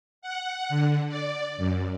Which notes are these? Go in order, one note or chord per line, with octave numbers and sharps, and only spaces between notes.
F#5
D3
D5
F#2